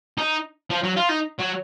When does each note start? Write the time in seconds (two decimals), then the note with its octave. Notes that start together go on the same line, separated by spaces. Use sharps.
0.18 D#4
0.70 F3
0.84 F#3
0.97 F4
1.09 D#4
1.40 F#3